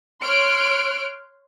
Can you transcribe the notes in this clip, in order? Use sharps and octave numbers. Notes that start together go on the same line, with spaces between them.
C#5 C6 F6 F#6 D7